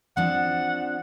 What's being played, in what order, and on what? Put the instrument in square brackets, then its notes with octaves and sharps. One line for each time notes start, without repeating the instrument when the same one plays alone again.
[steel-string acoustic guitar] F3 C4 D4 [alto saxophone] F#5